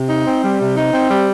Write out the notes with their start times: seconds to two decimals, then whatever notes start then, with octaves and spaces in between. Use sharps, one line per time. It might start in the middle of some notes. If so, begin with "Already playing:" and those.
Already playing: C3
0.09 D#4
0.26 C4
0.42 G3
0.60 C3
0.76 D#4
0.93 C4
1.09 G3